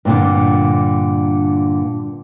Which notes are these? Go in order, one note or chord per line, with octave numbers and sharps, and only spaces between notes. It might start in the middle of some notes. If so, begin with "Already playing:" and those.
G2 A#2 D3